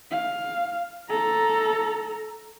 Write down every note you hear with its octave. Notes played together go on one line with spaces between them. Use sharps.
F5
A4 A#5